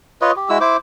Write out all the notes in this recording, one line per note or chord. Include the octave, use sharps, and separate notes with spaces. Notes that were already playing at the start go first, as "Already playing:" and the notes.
F4 B4 C#5 D#5
G4
G#3 E4 F#4 E6
E4 C5 D6